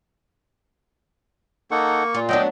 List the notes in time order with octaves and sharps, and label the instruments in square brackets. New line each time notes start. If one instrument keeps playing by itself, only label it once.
[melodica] A#3 C#6 [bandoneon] D#4 A4 F#5
[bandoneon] A#2 [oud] F4
[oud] F#3 B3 D4 [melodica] D#5 G5